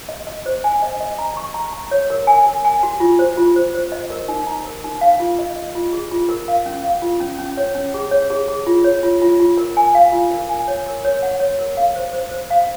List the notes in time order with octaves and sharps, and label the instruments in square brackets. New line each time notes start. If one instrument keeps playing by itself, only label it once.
[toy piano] D#5
D#5
C5
G#5
D#5
D#5
A#5
C#6
A#5
A#5
C#5
A#4
G#5
A#4
G#5
F#4
F4
C5
F4
C5
C5
D#5
A#4
D#4
A#5
A#4
D#4
F5
F4
D#5
D#5
F4
G#4
F4
A#4
F5
C#4
F5
F4
C#4
C#4
C#5
C#4
G#4
C#5
G#4
G#4
F4
C#5
F4
F4
F4
A#4
G#5
F5
F4
A#4
G#5
C#5
A#4
C#5
F#5
C#5
A#4
F5
C5
C5
C5
F5